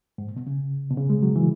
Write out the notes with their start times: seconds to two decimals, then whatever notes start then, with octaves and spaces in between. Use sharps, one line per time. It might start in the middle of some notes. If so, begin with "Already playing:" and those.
0.18 G#2
0.27 A#2
0.36 B2
0.47 C#3
0.90 B2
0.97 C#3
1.10 G#3
1.23 F#3
1.36 E3